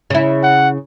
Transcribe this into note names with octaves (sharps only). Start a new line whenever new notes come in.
C#3 E4
F#5